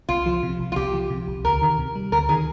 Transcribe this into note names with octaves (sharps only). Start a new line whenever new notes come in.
C2 F4
F3
C3
C2
F4
C2 G4
F3
C3
C2
D2 A#4
D#3
C3
G3
D2 A#4
D#3 G#4